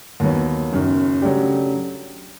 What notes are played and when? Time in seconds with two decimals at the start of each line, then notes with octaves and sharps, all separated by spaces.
0.20 D#2 D#3 F#3 B3
0.72 F#1 F#2 D#3
1.22 C#3 F#3 A3 D4 G4